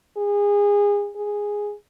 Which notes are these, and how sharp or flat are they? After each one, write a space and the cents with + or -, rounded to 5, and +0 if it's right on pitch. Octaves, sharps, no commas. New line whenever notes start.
G#4 -25
G#4 -5